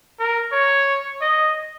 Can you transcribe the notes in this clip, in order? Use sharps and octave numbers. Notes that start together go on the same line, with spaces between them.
A#4
C#5
D#5